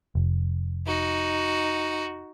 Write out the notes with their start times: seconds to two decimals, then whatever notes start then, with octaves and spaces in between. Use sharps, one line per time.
0.15 F1
0.86 D#4 F#4